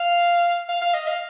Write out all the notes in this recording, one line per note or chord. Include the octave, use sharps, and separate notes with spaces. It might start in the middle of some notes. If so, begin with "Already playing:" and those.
Already playing: F5
F5
F5
D#5
F5